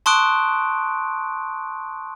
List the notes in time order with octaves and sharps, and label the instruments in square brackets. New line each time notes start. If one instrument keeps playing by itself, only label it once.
[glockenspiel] A5 C6 C#6 D#6 F#6 D7